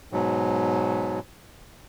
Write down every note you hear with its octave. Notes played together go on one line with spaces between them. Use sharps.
G#2 B2 F#3